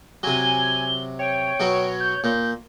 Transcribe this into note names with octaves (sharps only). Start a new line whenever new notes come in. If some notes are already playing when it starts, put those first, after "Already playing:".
C3 F#3 G#5 G7
C#5 G5
B2 F#3 F#4
G6
A#2 G6